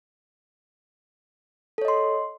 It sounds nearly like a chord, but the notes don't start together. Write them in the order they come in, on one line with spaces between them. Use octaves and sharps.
A4 C#5 D#5 C6